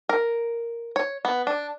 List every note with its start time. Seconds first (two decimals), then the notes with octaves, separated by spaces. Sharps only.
0.09 A#4
0.96 C#5
1.25 B3
1.47 D4